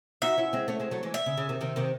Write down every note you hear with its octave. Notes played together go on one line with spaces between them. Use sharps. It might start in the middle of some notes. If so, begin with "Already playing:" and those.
D#4 F#4 E5
C#4 E4
G#3 C4
A3 C#4
G#3 C4
F#3 A3
E3 G#3
E5
C#3
C#3
C3 D#3
C3 D#3
C3 D#3